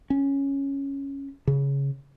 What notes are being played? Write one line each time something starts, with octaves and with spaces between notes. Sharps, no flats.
C#4
C#3